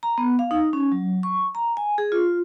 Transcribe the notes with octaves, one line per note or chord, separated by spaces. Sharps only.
A#5
B3
F5
D#4
C#4
F#3
C#6
A#5
G#5
G#4
F4